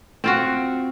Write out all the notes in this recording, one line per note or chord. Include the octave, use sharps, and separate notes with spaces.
C4 F4 F#4